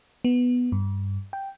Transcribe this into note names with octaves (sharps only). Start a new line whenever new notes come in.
B3
G2
G5